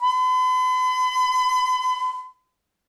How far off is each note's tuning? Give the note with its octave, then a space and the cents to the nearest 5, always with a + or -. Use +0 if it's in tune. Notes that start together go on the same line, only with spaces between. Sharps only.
B5 +45